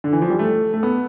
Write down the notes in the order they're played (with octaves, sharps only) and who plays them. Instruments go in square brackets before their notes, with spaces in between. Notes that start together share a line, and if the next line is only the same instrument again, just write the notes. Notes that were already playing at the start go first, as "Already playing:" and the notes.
[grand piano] D3
E3
F3
G3
A3
A3
B3